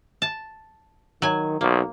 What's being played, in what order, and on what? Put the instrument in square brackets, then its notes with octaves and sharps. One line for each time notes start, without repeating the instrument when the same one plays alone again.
[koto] A5
[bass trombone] D#3 [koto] F#3 G#5
[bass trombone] B1 [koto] A#3